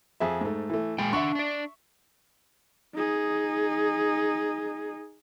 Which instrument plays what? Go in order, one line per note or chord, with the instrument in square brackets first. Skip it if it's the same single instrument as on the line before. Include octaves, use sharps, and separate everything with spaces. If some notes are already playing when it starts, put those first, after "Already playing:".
[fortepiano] F2 G#4 E5
G#2 A3
E3 A3
[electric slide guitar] A#2 G#3 G5 [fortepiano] G#5
[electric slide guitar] D4 F#5 [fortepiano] E5 C#6
[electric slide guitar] D4 D5
[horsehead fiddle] D#4 G#4